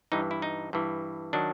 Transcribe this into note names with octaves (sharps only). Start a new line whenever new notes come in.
G2 E3 D#4
E4
D#4
G2 E3
D#3 F#3 D4